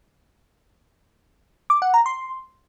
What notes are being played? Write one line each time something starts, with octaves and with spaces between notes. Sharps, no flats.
D6
F#5
A#5
C6